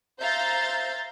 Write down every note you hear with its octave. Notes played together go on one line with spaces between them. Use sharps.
C5 E5 F5 A#5 G6 A6